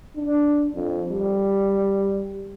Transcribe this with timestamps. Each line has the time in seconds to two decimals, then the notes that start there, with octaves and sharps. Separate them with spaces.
0.16 D4
0.75 F2
1.09 G3